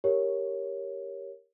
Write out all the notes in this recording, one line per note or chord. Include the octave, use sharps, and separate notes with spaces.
G4 A#4 C#5